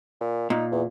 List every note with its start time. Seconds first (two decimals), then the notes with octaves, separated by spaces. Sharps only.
0.21 A#2
0.50 A#2 D#4
0.72 E2